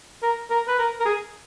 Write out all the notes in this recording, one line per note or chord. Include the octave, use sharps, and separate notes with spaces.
A#4
A#4
B4
A#4
A#4
G#4